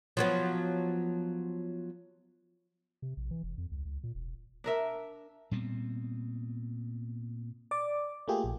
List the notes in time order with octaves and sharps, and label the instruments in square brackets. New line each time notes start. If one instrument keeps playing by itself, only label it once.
[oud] F3 F#3 B3
[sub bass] C3
A#1
E3
F1
F2
C#2
C#2
A#2
E1
[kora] D4 A#4 E5
[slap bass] A#2 G3 B3 C4
[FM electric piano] D5 D6
A3 A#3 F4 G4 G#4
A#1